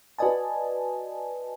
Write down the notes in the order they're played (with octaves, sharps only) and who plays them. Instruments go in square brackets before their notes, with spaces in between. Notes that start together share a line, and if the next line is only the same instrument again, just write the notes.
[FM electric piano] F#4 B4 D5 D#5 G#5 A5